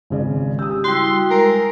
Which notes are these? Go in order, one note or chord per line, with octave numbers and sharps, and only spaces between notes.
G#1 C#3 D5
G4 D#6 E6
G3 E4 F#4 C6
G#3 A#4